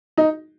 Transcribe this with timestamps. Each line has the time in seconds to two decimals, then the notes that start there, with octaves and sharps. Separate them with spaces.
0.17 D#4